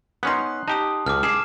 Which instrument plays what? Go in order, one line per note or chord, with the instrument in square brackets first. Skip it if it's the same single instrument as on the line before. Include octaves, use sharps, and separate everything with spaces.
[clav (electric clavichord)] B3 C#4 D#4 [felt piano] C6 F#6
[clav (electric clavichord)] D#4 G4 [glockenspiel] A5 D#6
[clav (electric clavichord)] C#2 [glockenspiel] D6 F6
[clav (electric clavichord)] G#4 [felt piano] D6 C7 [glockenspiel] E7